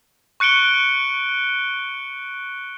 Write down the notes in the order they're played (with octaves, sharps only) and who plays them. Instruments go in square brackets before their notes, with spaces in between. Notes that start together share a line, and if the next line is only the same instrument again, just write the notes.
[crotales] C#6 F#6 C#7 D7 G7